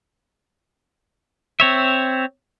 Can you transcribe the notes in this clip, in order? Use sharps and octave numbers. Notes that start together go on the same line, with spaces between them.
C4 C#5 E5